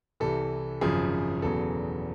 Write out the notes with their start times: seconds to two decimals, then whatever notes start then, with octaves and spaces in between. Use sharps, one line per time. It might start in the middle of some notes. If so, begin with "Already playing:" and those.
0.20 C2 C3 E3 A4
0.81 G#1 F#2 C#3 F3 G#4
1.42 E1 E2 C#3 F#3 A4